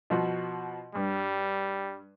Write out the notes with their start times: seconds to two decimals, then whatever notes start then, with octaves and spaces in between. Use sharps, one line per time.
0.10 B2 F3 F#4
0.95 G2 G3